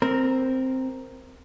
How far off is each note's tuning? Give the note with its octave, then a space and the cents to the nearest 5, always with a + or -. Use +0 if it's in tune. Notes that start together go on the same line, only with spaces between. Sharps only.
C4 +0 A#4 +0